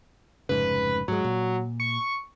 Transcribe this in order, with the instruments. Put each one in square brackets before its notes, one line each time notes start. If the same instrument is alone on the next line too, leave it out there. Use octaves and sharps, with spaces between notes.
[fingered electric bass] F1 G#2 C#3 [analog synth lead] B4
[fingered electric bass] G#2 G#3 [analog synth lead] F#3
[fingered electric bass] A#2
[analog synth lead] C#6